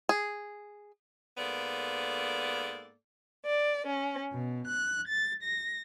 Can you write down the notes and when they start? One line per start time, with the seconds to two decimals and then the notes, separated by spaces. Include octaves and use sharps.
0.09 G#4
1.38 G#2 A#3 B3 A4 D5
3.45 D5
3.87 C#4
4.32 B2
4.67 F#6
5.08 A6
5.42 A#6